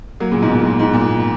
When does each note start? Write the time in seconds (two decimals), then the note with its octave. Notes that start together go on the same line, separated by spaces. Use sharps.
0.20 F#3 A#3
0.31 A#2 C#3
0.42 G#2 B2
0.54 A#2
0.65 A#2
0.79 G#2
0.94 A#2